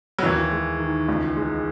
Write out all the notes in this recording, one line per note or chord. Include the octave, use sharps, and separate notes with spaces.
F#3
D#2 E3
G#3
D#3
C#2
G#3